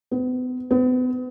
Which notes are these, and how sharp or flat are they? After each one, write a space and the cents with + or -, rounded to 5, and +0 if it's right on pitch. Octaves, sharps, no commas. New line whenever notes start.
B3 +40
B3 +40